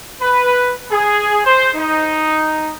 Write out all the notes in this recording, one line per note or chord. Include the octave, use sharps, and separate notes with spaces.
B4
G#4
C5
D#4